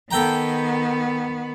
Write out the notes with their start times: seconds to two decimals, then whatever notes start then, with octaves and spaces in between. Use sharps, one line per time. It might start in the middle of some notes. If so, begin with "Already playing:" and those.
0.11 D#3 B3 A4 G5 A#5